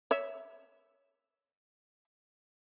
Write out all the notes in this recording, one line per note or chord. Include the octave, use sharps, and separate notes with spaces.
C#5 E5